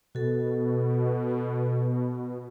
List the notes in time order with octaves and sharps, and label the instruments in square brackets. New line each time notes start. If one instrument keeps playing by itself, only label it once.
[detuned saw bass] B2 [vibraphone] F#4 A4